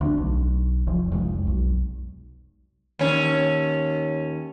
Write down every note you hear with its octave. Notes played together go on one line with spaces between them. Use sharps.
D2 B3 D4
B1
F1 F3
F1 C2 F2 G#3
B1
D#2 C#4